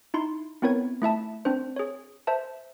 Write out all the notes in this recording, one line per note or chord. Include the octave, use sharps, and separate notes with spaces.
D#4 E4 C6
B3 C4 E4 A#4 C#5 G#6
A3 E4 E5 A5
C4 D4 C5
G#4 C#5
C5 E5 A5